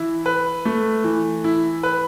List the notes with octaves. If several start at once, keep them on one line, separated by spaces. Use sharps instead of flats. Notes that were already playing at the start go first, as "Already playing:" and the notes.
Already playing: E3 E4
B4
A3
E3
E4
B4